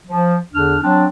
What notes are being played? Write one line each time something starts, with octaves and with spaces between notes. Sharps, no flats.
F3
E2 D3 D4 F6
F#3 C4 D4